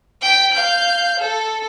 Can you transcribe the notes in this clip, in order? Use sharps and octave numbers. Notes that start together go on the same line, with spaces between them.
G5 B6
F5 G6
A4